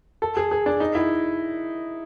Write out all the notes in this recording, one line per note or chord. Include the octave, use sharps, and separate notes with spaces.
A4
G#4
G#4
D4
D#4
E4